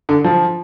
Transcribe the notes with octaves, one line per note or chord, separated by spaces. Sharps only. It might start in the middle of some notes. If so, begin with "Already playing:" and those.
D3
F3